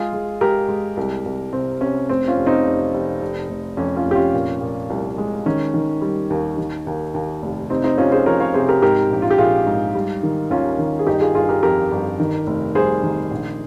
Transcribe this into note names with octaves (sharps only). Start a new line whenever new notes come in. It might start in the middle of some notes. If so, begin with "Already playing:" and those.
Already playing: G#3 F4 G#4
G#3
G#3 G4 A#4
G#3
C2
C2
C3 C4
C3 C#4
F1 C4
C#4 F4
F1
C4 D#4
F1
F1
F1
F1
F2 C#4
C#4 F4
F1
G4
C#4 F4
A#2
A#2
C2
G#3
D#3 C#4
D#3
G3
D#2
D#3
D#2
D#2
F1
C3 C4 D#4
C4 D#4
C3 C#4 F4
G#4 C5
F3 A#4 C#5
C#5 F5
C3 G#4 C5
G4 A#4
G#2 G4 A#4
A#1
F4
G4
A#1 F4 G#4
G#2
G3
D#3
D#2 C#4 F4
D#3
G#4
G1 D#4 G4
F4 G#4
G1 F4 G#4
G4 A#4
F2 G4 A#4
G1
D#3
F1
G3 G#4 C5
D#3
A#1